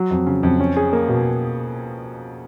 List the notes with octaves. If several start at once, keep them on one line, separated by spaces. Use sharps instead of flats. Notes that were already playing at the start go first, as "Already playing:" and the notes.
Already playing: F#3
F2
C#3
F2
C#4
G#4
A#3
B2